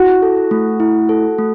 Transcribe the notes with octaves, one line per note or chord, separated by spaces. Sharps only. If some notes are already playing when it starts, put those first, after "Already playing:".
Already playing: E4 F#4
A4
A3
E4
A4
A3